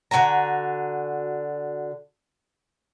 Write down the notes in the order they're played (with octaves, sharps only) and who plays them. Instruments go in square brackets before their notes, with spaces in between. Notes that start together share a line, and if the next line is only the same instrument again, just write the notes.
[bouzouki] D3 F#4 G#5 A#5